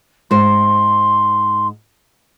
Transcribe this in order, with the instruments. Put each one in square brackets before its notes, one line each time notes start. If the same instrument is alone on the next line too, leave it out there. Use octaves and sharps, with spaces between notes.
[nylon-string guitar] G#2 C5 [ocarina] C6